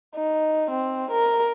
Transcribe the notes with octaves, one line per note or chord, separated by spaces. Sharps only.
D#4
C4
A#4